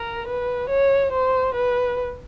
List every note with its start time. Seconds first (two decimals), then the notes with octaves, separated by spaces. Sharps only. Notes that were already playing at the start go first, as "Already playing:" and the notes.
Already playing: A#4
0.27 B4
0.70 C#5
1.12 C5
1.55 B4